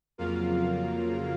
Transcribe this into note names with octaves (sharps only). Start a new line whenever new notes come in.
F2 C#3 F#3 A#3 F4 F5